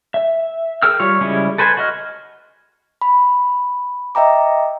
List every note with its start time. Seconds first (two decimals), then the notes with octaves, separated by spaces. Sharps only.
0.14 E5
0.82 G#4 A#4 G5 E6 F6
1.00 G3 F4 C#5
1.21 C#3 G3 G#3 C#4 E4
1.58 A4 B4 C5 G#5
1.77 F#4 D#5 F6
3.01 B5
4.15 D#5 E5 G5 A#5 D6